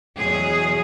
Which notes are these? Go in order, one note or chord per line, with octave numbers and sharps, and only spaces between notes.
E2 B2 F#3 G#4